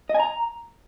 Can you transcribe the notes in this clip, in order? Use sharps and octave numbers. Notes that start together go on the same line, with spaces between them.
D#5
G#5
A#5